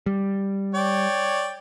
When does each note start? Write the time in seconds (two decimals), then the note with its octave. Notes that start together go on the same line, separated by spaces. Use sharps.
0.06 G3
0.75 C#5 D5 G5